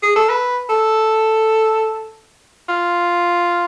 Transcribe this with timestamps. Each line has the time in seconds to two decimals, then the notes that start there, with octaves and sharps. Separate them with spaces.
0.03 G#4
0.16 A4
0.29 B4
0.69 A4
2.69 F4